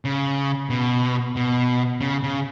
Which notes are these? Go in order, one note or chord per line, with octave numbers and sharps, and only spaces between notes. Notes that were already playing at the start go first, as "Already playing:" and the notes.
C#3
B2
B2
C#3
C#3